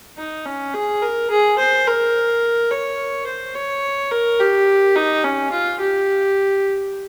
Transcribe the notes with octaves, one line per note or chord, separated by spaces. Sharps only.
D#4
C#4
G#4
A#4
G#4
C5
A#4
C#5
C5
C#5
A#4
G4
D#4
C#4
F4
G4